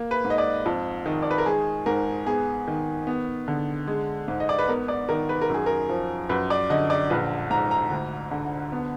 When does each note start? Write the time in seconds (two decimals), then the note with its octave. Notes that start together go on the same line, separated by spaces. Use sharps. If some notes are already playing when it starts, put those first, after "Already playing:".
Already playing: A#3
0.11 B4
0.25 G#2
0.30 D#5
0.38 D5
0.66 F2
1.06 D#3
1.22 D5
1.31 B4
1.38 A#4
1.46 G#3 G#4
1.86 G#2 A#4
2.26 B3 G#4
2.67 D#3
3.07 B3
3.48 D3
3.87 G#3
4.28 G#2
4.40 D#5
4.49 D5
4.59 B4
4.68 B3 A#4
4.88 D5
5.09 D#3 A#4
5.29 B4
5.42 A#4
5.49 F#2 G#4
5.66 A#4
5.89 F3
6.29 F#2 B4
6.50 D5
6.70 D3 D#5
6.90 D5
7.10 A#1 B4
7.50 G#2 A#5
7.71 A#5
7.91 D2
8.31 D3
8.72 B3